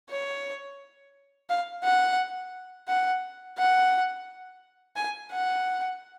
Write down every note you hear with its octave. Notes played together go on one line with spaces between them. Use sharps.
C#5
F5
F#5
F#5
F#5
G#5
F#5